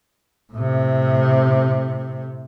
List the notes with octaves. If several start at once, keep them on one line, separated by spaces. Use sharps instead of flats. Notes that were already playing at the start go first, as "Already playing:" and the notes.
A2 C3